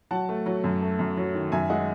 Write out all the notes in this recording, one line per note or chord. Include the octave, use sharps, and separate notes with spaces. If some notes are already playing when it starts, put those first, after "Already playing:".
F#3 F#5 A5
A3
F#3
F#2
A3
F#2
F#3
D#3
F#2 E5 G#5
G#3 D#5 F#5